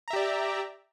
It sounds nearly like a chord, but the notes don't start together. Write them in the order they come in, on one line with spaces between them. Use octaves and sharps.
A#5 E5 G4 D5